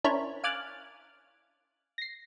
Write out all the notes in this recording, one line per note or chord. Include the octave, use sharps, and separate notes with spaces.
C#4 D4 E4 A#4 C5 C#5
F5 G#5 D6 F6 F#6 A6
A#6 C7